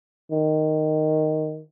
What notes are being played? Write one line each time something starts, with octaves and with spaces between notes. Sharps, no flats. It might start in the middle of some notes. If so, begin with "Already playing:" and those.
D#3